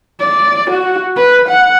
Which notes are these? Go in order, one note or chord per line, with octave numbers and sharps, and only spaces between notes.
D5
F#4
B4
F#5